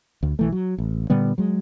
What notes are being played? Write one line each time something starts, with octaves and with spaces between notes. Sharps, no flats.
D2
B1 E3 A3
F#3
A1
A#2 D3 G3 B3
F#3 G#3